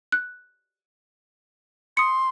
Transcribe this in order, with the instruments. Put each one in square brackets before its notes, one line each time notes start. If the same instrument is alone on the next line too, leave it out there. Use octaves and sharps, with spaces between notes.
[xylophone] F#6
[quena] C6 [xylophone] D#6 C#7